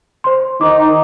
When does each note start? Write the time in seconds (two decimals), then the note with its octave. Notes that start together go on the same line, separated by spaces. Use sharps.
0.24 C5 C6
0.61 D#3 D#4 D6